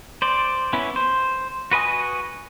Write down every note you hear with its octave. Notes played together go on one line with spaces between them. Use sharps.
C5 D5
B3 C#4 E4
C5
F#4 B4 D#5 G#5 D#6